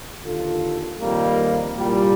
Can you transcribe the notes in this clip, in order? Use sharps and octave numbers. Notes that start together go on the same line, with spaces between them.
D#2 D3 F4 A4
F2 D#3 G3 A#3
C2 A#2 G3